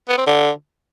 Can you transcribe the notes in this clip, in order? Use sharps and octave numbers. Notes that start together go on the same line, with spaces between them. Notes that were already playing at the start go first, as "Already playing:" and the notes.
B3
C4
D3